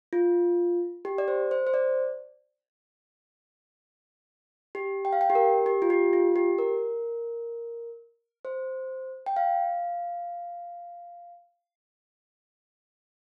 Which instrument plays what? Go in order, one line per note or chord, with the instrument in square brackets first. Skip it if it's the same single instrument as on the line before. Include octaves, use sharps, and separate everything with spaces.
[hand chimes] F4
G4
D5
C5
C5
C5
D5
G4
G5
F5
G5
G4
A#4
G4
F4
G4
F4
G4
A#4
C5
G5
F5